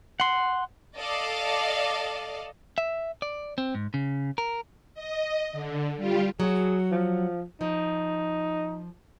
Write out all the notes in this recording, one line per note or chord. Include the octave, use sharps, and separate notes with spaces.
F#5 C6
A4 D5 D#5 F5
E5
D5
C4
G#2
C#3
A#4
D#5
D3
G3 F4 G4
F#3 F#4 G#4
F3
F3 D#4